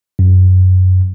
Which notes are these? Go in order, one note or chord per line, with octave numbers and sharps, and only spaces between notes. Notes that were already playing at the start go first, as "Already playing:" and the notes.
F#2